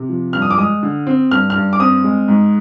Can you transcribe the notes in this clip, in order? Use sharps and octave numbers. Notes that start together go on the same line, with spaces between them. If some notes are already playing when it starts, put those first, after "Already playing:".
Already playing: C3
F3
G2 F6
D#6
D6
G#3 D#6
D3
C4
G2 F6
F6
G2
D6
C4 D#6
G#3
G#2